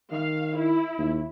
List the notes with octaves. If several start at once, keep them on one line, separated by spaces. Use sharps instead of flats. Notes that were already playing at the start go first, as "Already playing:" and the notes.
D#3 F5
E4
D#2